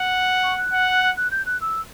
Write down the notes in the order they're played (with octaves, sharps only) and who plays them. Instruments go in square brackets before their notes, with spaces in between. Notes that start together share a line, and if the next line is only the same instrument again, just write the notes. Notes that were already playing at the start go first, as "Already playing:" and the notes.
Already playing: [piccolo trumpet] F#5
[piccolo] C#6
F#6
[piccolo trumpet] F#5
[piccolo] F#6
G6
F#6
E6